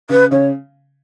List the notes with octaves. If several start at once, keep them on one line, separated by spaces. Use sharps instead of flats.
C#3 B4
C#3 C#5